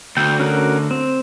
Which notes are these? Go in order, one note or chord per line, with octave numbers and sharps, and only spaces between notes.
D2 G5
C#4 F#4 A#4
C4